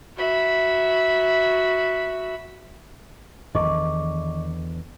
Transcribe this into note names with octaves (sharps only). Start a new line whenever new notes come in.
F#4 E5 B5
E2 D3 D#3 F#3 D#5 C#6 D6